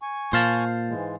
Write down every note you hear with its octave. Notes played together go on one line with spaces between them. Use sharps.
G#5 C#6
A#2 C5 F5 A5
G#2 E3 G#3